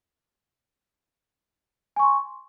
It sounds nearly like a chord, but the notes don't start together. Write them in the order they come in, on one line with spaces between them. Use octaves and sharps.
G#5 C#6 C6